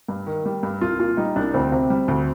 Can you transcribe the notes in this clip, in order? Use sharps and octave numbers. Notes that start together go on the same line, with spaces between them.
G2
D#3
G3
G2
C2 F4
A#2 F4
G3 D#4
C2 D4
D2 C4
C3
G3
D2